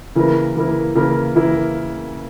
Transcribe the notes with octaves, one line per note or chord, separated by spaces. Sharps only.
C#3 E3 A#3 E4 A#4
C#3 E3 A#3 E4 A#4
C#3 E3 A#3 E4 A#4
C#3 E3 A#3 E4 A#4